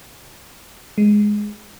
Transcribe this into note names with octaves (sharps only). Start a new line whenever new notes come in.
G#3